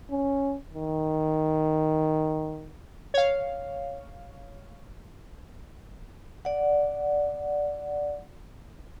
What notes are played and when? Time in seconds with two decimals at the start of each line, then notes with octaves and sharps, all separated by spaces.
0.11 C#4
0.74 D#3
3.14 C#5 F5
6.45 D5 F#5